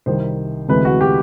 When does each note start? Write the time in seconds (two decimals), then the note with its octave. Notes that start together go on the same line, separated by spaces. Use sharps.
0.06 C2 C3 D#3 G3 C5
0.68 D2 C3 E3 G#3 B4
0.85 F#4
1.01 G4